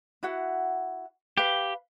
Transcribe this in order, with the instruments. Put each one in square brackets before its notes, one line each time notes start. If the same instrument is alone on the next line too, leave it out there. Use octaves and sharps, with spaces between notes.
[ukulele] E4 F#4 F#5
[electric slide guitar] G4 [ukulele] B4 F5